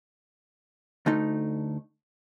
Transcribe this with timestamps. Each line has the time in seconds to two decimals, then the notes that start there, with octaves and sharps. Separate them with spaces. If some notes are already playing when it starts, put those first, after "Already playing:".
1.06 D2 A3 D#4